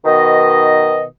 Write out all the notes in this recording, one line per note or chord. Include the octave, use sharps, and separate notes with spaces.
B2 D#3 D#5